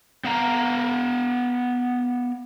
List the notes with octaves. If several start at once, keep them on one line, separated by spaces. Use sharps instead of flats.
B3 F5 A#5